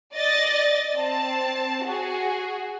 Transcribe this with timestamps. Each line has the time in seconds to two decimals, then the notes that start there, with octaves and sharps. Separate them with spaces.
0.16 D5 D#5 A6
0.96 C4 A5
1.85 F#4 G#4